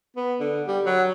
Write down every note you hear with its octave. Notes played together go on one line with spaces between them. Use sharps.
B3
D3
G3
F#3